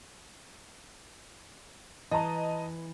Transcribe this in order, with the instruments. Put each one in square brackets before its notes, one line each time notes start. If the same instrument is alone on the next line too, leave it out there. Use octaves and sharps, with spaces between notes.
[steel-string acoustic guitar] E3 [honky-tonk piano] D#5 A5 A#5